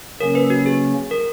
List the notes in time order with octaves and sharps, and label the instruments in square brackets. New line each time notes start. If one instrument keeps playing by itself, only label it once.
[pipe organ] C#3 F#3 A#3 C#4 [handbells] A#4
[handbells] B4
F#4
G#4
A#4